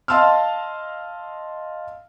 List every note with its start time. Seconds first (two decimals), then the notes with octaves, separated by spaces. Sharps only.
0.08 D#5 F5 A5 C6 E6 F6